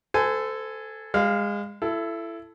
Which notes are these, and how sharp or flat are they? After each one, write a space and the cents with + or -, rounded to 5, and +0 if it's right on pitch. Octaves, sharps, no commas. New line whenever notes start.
A4 +0 C5 -35 G#5 +0
G#3 -25 F5 +0
E4 +25 A4 +0